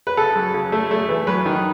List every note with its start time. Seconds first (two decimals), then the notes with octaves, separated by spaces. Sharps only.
0.07 B4
0.17 C#3 A4
0.35 F#2
0.54 C#3
0.72 A3
0.91 A3
1.09 E3
1.27 F#2 B4
1.46 D#3